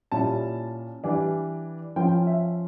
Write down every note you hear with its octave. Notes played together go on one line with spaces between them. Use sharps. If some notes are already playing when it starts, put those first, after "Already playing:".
A#2 G3 C#4 E4 A5
E3 G3 D4
F3 C#4 F4 G5
E5